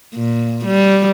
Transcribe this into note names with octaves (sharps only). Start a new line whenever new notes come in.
A#2
G3